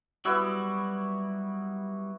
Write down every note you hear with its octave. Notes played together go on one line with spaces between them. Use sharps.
F#3 G3 B3 E4 F#4 E6